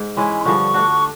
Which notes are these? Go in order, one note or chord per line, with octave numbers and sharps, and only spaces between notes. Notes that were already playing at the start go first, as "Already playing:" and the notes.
Already playing: G#2
E3 G#3 C#4 E4
C6
G2 D3 F3 C#6
A3 D4 F#4